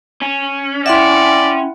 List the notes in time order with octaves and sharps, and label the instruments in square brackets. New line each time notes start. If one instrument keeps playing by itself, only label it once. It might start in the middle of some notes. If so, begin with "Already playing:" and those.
[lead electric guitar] C#4
[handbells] E4 F#5 [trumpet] D5 [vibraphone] E5 G5 C6